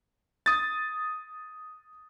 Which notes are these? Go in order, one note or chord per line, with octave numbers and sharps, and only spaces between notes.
D#6 A6